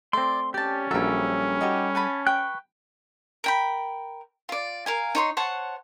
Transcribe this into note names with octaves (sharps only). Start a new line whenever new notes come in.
A3 C4 D5 C6
C#4 G4 D5 A5
A#1 F#3 G3 A4 A#4 E5
D#4 F#4 G4
F#5 G#5 A5 B5
B4 G5 C#6 F#6
A#4 G5 B5
F4 D5
A#4 F5 G#5
D#4 C#5 C6
C5 C#5 F#5 A5